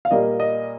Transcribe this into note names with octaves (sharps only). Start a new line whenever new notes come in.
F5
A#2 G3 A#3 D#5
D#5